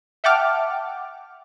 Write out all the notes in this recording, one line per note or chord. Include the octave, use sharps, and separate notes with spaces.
E5 F#5 G5 A5 D6 F6